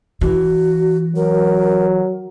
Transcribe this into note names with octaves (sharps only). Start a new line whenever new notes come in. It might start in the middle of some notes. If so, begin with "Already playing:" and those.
E3 F#4
F#3 A#4